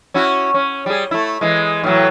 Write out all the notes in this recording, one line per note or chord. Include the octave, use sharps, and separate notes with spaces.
C#4 E4 F#4
C#4
G3 G#4
A3 E4
E3 G#3
A2 E3 F#3